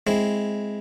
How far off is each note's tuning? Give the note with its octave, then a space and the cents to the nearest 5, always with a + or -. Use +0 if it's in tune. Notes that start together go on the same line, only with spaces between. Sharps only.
G#3 +0 C4 +0 E4 +0